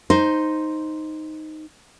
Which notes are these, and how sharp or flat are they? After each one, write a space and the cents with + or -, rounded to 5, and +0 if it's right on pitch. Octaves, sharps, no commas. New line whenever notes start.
D#4 +0 C5 +0